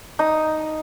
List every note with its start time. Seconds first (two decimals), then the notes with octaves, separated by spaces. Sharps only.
0.19 D#4